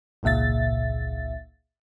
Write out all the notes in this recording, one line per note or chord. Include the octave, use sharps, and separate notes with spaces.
G#1 C#2 A#2 E5 A6